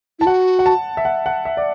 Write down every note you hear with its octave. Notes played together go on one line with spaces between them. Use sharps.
E4 A5
F#4 F#5
F#5
A5
E5
F#5
F#5
E5
D5